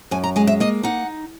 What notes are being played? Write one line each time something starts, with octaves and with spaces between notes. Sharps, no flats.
F#2 G#5
A#5
G#3 G#5
E5
A#3 D#5
D#4 F#5